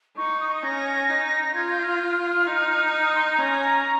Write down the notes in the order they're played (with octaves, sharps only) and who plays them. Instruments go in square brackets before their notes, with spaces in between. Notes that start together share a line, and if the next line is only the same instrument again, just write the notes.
[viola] D#4 [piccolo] C#6
[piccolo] D#6
C#6
D#6
[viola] C#4 [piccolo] A#6
[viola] D#4
[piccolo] A#6
[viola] F4 [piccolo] G#6
[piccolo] G6
F6
F6
[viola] D#4
[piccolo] F6
D#6
C6
A#5
[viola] C#4 [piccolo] A#5